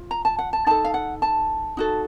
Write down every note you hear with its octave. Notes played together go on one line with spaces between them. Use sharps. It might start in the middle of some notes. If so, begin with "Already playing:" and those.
Already playing: F4
A#5
A5
F#5
A5
D#4 A4 A5
F5
F#5
A5
D#4 F#4 A4